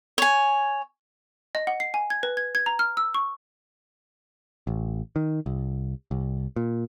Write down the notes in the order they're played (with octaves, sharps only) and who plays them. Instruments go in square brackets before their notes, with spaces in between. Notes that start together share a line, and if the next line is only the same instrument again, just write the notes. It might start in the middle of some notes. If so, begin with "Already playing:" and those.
[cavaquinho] C#5 G#5
[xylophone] D#5
F#5
C7
G#5
G#6
B4
G#6
G#6
A#5
F6
E6
C#6
[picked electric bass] A1
D#3
C2
C2
A#2